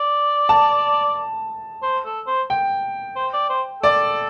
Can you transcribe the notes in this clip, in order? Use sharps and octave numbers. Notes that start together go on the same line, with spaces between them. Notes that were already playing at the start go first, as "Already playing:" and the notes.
Already playing: D5
A5
C5
A4
C5
G5
C5
D5
C5
A4 D5